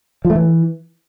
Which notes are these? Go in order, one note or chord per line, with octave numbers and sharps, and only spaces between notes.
F3
A3
E3